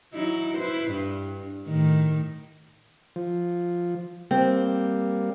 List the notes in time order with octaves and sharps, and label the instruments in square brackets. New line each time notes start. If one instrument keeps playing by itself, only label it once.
[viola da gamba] F#3 D#4 E4
E4 B4 C5
G2
A2 D#3
[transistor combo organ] F3
[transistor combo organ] G3 A#3 [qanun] C4